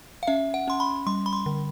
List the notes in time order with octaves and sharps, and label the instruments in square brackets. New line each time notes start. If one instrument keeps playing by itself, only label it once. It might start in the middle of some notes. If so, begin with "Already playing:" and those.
[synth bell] F5
C#4 E5
F#5
C#4 C6
B5
G3 C6
B5
C6
D3